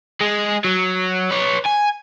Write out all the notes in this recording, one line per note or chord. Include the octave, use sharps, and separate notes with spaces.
G#3 G#4
F#3
B4 C#5
G#5